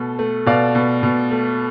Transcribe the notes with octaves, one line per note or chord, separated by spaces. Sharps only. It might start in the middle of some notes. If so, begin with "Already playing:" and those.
Already playing: B2 A3 A4
A3
B2 D5 F5
B2
B2
A3